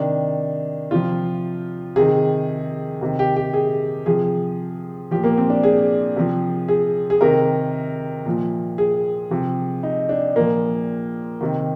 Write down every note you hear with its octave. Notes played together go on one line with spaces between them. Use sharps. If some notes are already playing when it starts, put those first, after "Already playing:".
Already playing: C3 D#3 D4
C3 F3 F4
C3 D#3 G#4
C3 D#3
G4
G4
G#4
C3 F3 G#4
A#2 F3 G4
A#3
C4
D4
G#4
C3 F3
G#4
G#4
C3 D#3 A#4
A#2 F3
G#4
C3 F3
D#4
D4
A#2 F3 A#3
C3 D#3